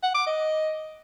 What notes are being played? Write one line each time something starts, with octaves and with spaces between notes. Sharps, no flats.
F#5
D6
D#5